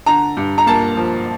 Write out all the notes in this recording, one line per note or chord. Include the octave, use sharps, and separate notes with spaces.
D3 A#5
G2
A#5
A#3 A5
F3